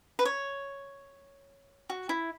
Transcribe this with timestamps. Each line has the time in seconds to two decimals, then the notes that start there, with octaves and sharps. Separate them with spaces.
0.19 B4
0.25 C#5
1.90 F#4
2.09 E4